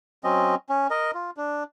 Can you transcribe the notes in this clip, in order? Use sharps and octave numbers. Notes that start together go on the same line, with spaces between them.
F#3 C4 C#4 D#5
C#4
A#4 D#5
F4
D4